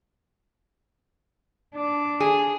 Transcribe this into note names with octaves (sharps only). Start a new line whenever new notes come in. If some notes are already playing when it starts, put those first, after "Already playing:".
D4
G#4